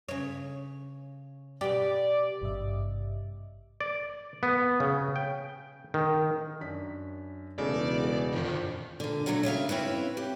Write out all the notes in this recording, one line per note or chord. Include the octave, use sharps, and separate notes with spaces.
C#3 C#5
B2 G4 D5
G#1 G2 C3 G4 D#5 E5
D5
B3
C#3
G5
D#3
F#2 D4 B6
E1 C#3 G#3 A3 D#4 A4 D5
F#4 G#4
A#1 F2 D3 D#3
A#2 D3
A#2 D3 F#3 G#3 A3
D#2 C#3 E5 F5
C4 C#4 E4 B4
G4